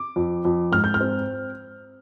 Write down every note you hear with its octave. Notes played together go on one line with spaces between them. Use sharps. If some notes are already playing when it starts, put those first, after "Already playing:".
Already playing: D6
F2
F2
G#2 F6
G6
F6
C4